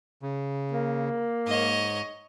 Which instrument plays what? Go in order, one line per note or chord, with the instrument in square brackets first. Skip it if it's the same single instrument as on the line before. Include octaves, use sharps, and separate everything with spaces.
[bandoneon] C#3
[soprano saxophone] A#3
[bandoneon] G#2 [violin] C#5 D#5